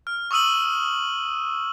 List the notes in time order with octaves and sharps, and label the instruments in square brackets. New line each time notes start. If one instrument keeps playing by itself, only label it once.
[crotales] F6
C#6 D#6 E6 D#7 F#7